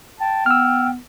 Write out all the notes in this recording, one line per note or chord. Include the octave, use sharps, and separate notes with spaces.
G5 A5
B3 E6 F6